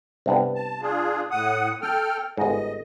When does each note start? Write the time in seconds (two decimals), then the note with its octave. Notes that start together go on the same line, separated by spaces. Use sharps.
0.26 C2 G2 B3
0.55 A5
0.82 D4 F4 G#4
1.31 A2 F#5 D#6
1.82 A4 G5 F6
2.37 G1 G#2 D#5